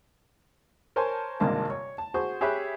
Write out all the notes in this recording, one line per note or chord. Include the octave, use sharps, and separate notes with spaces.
A#4 C5 C#5 G#5 A5 C6
G#1 G2 C3 G#3 A#3 A5
C#5
A5
F#4 G#4 C5 C#6
G4 G#4 C#5 E5 B5 F#6